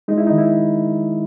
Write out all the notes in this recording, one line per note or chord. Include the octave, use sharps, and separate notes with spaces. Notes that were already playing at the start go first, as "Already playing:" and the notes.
G#3 D#4
E4
D#4
D#3
E4